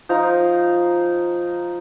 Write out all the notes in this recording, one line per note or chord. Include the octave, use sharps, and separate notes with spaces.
F3 D#4 F4 A#5